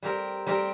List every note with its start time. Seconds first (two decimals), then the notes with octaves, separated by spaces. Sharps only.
0.03 G3 C4 G4 A#4
0.47 G3 C4 G4 A#4